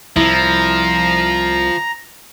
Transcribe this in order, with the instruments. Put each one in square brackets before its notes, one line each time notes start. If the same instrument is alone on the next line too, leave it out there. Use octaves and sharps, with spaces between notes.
[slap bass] C2 [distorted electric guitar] F3 [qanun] E4 [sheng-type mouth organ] A#5